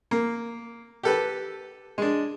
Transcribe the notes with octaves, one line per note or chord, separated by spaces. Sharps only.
A#3
G4 A4 B4
G#3 D4